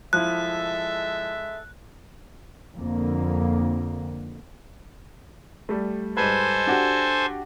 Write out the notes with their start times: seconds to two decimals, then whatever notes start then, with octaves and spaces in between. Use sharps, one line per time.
0.13 F3 G#3 E4 A4 E5 F#6
2.74 F2 D3 A#3
5.69 G3 A3
6.17 G#2 G3 A4 B4 C5 G#5
6.67 D4 F#4 G4